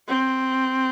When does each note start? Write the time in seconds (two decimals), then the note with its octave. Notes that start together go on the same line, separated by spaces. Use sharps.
0.08 C4